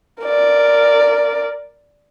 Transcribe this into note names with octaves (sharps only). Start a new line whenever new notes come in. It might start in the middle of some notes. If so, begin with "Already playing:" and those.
A#4 D5